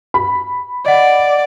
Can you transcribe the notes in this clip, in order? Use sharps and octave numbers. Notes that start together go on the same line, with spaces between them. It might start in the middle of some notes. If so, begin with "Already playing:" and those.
B5
D5 D#5 F#5